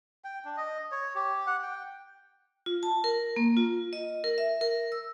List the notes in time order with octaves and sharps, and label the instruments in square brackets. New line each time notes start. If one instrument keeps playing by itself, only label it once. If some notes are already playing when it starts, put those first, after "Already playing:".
[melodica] G5
D4
D#5
C#5
G4
F#5
G5
[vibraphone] F4
A5
A#4
A#3
F4
D#5
A#4
E5
A#4
E6